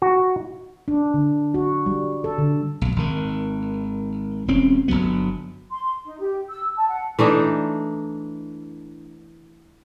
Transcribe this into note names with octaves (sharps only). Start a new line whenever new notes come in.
F#4
D4
D3
F#4
G3
A4
D3
B1
G#1 D#3
E1 C4 C#4
G1 F2 F#3 B3
C6
D#4
G4
E6
A5
F#5
E3 A3 D4 D#4